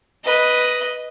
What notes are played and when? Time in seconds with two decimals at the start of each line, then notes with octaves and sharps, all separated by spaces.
0.25 B4 D#5